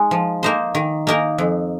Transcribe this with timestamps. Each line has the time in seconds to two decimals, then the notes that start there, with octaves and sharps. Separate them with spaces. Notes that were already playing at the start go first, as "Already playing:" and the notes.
Already playing: G#3 D#4
0.11 F3
0.43 A#3 D#4 C5
0.75 D#3
1.07 A#3 D#4 A#4
1.38 F2